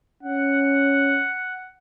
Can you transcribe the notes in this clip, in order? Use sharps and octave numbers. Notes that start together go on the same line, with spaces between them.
C#4 F#5